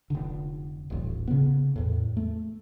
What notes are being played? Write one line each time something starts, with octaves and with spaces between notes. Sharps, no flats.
F1 D3
D#1 A1
C#3 B3
E2 A2
A3